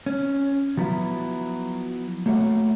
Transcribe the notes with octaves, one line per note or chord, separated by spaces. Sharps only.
C#4
F3 F#3 B3 E4
A3 A#3 F#4 C#5 F#5